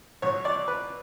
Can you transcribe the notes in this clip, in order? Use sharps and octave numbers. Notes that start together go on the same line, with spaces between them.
B1 B2 F#3 C#5
D5
B4